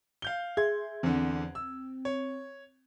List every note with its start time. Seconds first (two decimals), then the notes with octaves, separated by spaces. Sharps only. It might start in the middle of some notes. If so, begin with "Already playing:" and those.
0.22 F5 G6 G7
0.57 G#4 E5 C6 G#6
1.03 E2 D3 C4
1.55 E6
2.05 C#5